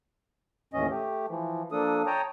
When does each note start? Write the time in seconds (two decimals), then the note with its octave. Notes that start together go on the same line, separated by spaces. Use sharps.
0.74 D#2 A2 E3 C#4 D#5
0.90 A3 G4
1.28 E3 F3
1.72 F3 A#3 D4 A4 D#6
2.06 C#5 G5 A5 A#5 D#6